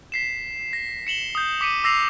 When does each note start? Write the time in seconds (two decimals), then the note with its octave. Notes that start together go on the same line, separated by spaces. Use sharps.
0.12 B6 C7 E7
0.73 A#6
1.07 C#7 E7 F#7 G7
1.35 D#6 G6
1.61 D6 B6 C#7 D#7
1.84 D6 E6 A#6 C7 F7